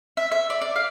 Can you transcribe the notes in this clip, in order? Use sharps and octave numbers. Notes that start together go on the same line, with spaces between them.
E5
E5
D5
D5
F5